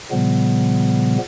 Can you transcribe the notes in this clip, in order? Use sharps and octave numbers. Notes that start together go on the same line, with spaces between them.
A#2 C#3 F3 G3 B3